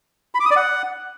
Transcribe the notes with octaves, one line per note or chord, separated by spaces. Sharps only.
B5
D6
D#6
D5
F#5